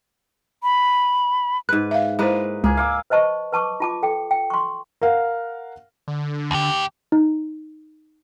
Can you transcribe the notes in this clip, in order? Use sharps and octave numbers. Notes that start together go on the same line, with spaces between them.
B5
G#2 B4 F#6
E5 F5
G#3 A#3 E4 B4 C5
C#2 A#3 G#4 G#5
F5 D6 E6
B4 C5 D#5 A5 C#6
B4 A5 C#6 D6
F4 A5 D6
A4 G5
G5
C6 C#6
A#4 F5 F#5
D3
D#2 G4
D#4